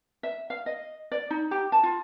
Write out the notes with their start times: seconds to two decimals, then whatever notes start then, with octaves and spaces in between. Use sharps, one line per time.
0.23 E5
0.50 F5
0.66 D#5
1.12 D5
1.30 D#4
1.51 G4
1.72 A5
1.83 F4